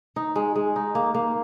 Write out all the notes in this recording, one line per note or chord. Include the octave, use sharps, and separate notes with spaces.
D#4
G#3
G#3
D#4
A#3
A#3